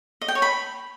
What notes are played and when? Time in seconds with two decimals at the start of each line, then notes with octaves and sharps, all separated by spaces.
0.21 D#5
0.28 G5
0.35 C#5
0.42 B5